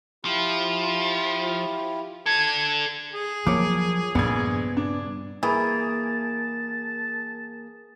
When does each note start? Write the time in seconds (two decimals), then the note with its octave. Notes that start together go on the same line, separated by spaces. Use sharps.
0.25 F3 E4 F4 G4
2.26 D4 A4 G#6
3.13 G#4
3.47 F3 F#3 A#3 C#5 D6
4.15 A#1 G2 C#3 B3 G#6
4.77 D4
5.43 E3 A#3 G#4 A5